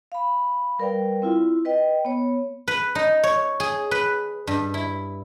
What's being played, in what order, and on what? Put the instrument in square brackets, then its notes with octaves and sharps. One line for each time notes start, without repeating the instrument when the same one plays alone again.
[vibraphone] F5 B5
G3 A#4 B4 D5 F5 G5
C4 E4 F4
B4 D#5 G5
B3 C#5
[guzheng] B4
D#4
C#5
G#4
B4
G2
E4